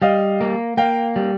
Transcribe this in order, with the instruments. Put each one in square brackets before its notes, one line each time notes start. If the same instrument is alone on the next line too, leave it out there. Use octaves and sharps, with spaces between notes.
[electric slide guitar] G3 [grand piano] D#5 F5
[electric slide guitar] A#3
[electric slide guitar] A#3 [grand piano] F5 G5
[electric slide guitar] G3